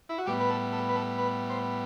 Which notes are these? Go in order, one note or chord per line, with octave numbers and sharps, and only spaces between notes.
E4
F#4
A2 G3 B3 G4
B4
A4
A4
B4
A4
B4
C5